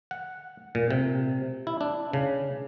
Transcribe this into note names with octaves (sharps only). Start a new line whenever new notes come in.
F#5
A#2
C3
E4
D4
C#3